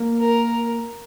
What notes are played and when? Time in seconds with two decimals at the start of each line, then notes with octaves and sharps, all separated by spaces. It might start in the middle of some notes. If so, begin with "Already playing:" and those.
Already playing: A#3
0.18 A#4